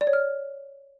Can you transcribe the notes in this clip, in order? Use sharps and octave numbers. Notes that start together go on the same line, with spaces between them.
D5
C#5
F6